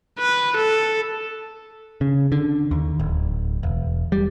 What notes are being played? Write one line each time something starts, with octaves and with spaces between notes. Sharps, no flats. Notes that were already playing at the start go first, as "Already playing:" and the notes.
B4
A4
C#3
D3
D#2
D1
E1
G3